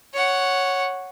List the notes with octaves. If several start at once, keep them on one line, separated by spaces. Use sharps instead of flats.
C#5 F#5